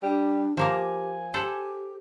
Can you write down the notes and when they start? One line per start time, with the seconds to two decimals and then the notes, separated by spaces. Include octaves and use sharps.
0.03 G3 D4
0.57 F3 A#3 G4 A#4 G#5
1.34 G4 A4 C5 F#5